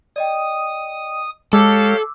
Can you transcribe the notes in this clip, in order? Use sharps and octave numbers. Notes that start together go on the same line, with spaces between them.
D5 D#5 G5 D#6
G#3 G4 A4 C#5 F5 D6 E6